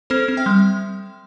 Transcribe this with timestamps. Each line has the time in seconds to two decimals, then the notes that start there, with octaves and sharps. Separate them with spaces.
0.10 C4 A4 C5
0.28 C4
0.37 E5 G5
0.46 G3